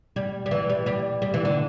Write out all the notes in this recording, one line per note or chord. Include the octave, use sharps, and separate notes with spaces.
G3
G3
E3
G3
G3
G3
E3
D3